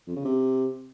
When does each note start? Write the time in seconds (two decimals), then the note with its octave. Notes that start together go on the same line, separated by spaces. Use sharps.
0.07 F2
0.16 C#3
0.25 C3